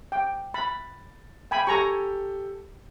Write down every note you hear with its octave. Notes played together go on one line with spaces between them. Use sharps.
G5
B5 A6
G5 G#5 B5
G4 A4 G#5 A#5 C#6